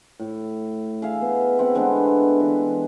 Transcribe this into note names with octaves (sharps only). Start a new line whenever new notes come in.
A2
G#4 E5 F5
B3
C4 E4 F#5
D3 G#3 B3 D4
E3